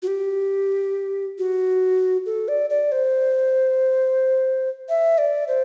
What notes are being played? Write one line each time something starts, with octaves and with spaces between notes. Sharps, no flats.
F#4
G4
F#4
A4
D5
D5
C5
E5
D5
C5